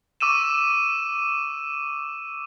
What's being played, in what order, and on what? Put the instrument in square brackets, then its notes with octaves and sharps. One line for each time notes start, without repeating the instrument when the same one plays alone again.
[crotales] C#6 D6 E6 D#7 E7